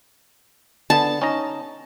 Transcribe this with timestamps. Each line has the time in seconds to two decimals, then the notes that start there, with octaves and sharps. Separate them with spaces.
0.90 D3 B3 A5
1.22 C#4 D#4 A#5